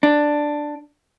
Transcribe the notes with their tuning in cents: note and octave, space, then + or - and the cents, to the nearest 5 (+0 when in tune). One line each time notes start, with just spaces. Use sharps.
D4 +5